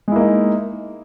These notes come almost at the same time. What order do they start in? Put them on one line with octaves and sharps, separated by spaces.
G#3 E4 A#3 D#4